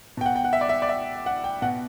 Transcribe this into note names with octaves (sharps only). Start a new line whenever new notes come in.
B2 G5
F#5
G5
F#5
E5
D5
E5
D5
E5
F#5
G5
B2 F#5